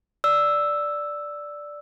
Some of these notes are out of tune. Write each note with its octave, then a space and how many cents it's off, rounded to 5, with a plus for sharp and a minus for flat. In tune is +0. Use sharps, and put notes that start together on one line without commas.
D5 +0 E6 +0